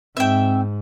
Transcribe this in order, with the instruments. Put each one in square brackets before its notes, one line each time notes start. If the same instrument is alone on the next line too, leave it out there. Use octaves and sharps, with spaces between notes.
[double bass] G#2 [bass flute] C4 [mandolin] E5 G5